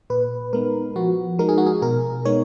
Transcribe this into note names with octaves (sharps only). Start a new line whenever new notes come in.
A#2 B4
G#3 B3 D#4 A#4
F3 F#4
G#3 D#4 A#4
G#4
F#4
G#4
B2 A#4
G#3 B3 D#4 C#5